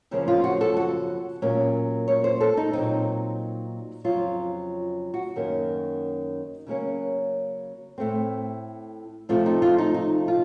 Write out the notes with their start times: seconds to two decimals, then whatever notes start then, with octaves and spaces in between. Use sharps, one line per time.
0.11 F#2 C#3 F3 A#3 C#4
0.28 F4
0.44 F#4
0.61 A4
0.77 F#4
1.42 A#2 F#3 A#3 C#4
2.08 C#5
2.24 C5
2.41 A4
2.57 D#4
2.73 A#2 F#3 C4 D#4
4.04 F2 C#3 F#3 F4
5.14 F#4
5.36 F#2 D#3 A#3 C#4
6.67 C#3 F#3 A#3 C#4
7.98 A2 A3 C4
9.29 C3 F3 A3 C4 F4
9.46 D#4
9.62 F4
9.78 D#4
9.94 D#4
10.28 F4